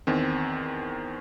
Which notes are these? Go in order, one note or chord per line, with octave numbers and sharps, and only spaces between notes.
E2 D#3 C4